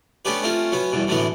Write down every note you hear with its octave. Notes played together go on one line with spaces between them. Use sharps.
A3 B3 C#4 D4 G4 B4
A3 C4 C#4 F4
F#3 B3 C#4
E2 G2 B2
F#2 A2 D3 E3 A3 B3